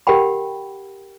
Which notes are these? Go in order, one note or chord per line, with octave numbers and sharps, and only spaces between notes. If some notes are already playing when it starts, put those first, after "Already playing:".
G4 A#4 F#5 G5 B5